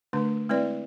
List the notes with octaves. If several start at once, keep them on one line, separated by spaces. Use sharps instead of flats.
D3 A3 D4 B4
G#3 C4 E4 B4 D5